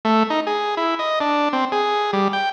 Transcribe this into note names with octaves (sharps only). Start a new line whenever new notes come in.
A3
D#4
G#4
E4
D#5
D4
C4
G#4
G3
G5